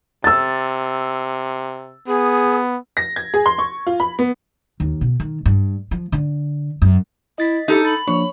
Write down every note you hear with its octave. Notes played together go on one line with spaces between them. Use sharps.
C3 E6 A6
B3 G#4
A#6
G#6
G#4
C6
C#6
F4
B5
B3
D#2
B2
D#3
G2
F3
D3
F#2
E4 D#5 A6 B6
D#4 G4 A4
B5 A6
F3 A#3 D4 C#5